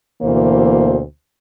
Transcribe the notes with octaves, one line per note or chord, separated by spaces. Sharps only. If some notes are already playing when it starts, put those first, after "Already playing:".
D2 B2 E3 A#3 C5